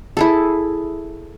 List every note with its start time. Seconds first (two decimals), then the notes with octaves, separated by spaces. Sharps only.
0.17 E4 G#4 A4